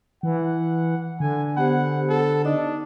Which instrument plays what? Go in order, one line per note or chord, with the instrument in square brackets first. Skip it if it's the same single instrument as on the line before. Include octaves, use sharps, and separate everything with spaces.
[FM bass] E3 [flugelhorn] F#5
[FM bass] D3 [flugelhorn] G#5
[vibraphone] B3 G4 C5 [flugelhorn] F#5
[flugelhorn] A4
[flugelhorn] D4 [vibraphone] D#4 D#5